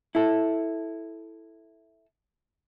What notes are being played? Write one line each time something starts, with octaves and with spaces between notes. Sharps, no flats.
E4 A4